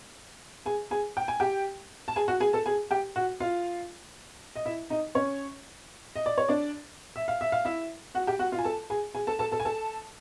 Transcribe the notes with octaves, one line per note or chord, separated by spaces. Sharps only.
G#4 G#5
G#4 G#5
G5
G#5
G4 G5
A5
G#4 G#5
F#4 F#5
G#4 G#5
A4 A5
G#4 G#5
G4 G5
F#4 F#5
F4 F5
D#5
E4 E5
D#4 D#5
C#4 C#5
D#5
D5
C#5
D4 D5
E5
F5
E5
F5
E4 E5
F#4 F#5
G4 G5
F#4 F#5
F4 F5
G#5
A4 A5
G#4 G#5
G#4 G#5
A4 A5
A4 A5
A4 A5
G#5
A4 A5